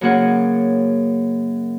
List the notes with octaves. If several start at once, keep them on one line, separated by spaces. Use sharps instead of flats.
F#2 C#3 A#3 G#4 F#5